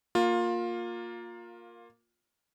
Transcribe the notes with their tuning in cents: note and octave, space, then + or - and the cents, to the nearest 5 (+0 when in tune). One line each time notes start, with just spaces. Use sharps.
A#3 +0 F4 +20